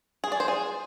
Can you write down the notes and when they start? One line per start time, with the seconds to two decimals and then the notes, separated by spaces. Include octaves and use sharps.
0.24 G#4
0.32 D5
0.40 C5
0.48 G#4